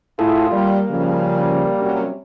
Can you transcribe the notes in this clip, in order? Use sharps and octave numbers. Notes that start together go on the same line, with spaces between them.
A2 E4 F4 G#4 A4
G3 A#3
C#3 F3 G3
C3 F#3 C#4